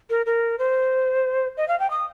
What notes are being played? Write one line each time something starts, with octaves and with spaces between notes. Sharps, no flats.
A#4
A#4
C5
D#5
F5
G5
D#6